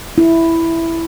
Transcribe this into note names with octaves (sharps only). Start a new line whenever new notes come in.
E4